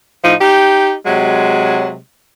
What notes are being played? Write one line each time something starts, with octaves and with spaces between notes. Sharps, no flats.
A2 F3 D#4
D#4 G4
C3 F#3 G#3